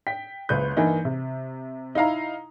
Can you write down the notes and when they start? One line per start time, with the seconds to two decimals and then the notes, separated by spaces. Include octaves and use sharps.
0.07 G5 B6
0.49 F#1 C#2 B4 G6
0.77 G2 E3 A#3 D#4
1.05 C3
1.95 D#4 E4 F5 A#5